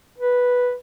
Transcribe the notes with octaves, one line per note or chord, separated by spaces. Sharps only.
B4